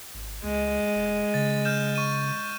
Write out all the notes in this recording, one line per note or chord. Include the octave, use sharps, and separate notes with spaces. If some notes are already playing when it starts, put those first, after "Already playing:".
G#1
C#2 G#3
E1
C#3 A6
F6 G6 E7
C#6 D#7